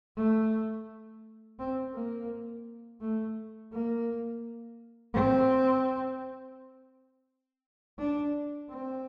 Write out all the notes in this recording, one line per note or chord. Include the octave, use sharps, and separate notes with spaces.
A3
C4
A#3
A3
A#3
C4
D4
C4